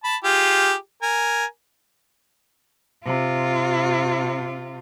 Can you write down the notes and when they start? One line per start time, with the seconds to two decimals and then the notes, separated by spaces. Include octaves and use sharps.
0.04 A5 B5
0.24 F4 G4 G#4
1.02 A#4 G#5
3.04 C3 F4